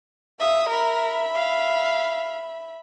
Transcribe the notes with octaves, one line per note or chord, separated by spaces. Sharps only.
E5 F5 D#6
A#4 E5 B5
F5